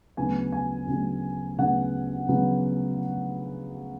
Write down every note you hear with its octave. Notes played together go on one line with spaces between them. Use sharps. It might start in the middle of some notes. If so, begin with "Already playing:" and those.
D2 C#3 F#3 B3 G#5
G#5
D2 C#3 F#3 B3
D2 C#3 F#3 B3 F#5
C#3 F#3 B3